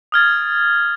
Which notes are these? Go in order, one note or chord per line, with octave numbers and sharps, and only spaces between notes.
D#6 F6 G#6 A6